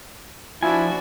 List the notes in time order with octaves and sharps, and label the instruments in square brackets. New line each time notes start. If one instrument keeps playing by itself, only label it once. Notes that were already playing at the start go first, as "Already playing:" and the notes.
[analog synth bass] F3 [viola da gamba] D4 F#4 [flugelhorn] E4 [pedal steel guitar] G#5